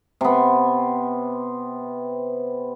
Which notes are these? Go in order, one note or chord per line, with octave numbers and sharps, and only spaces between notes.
C3 B3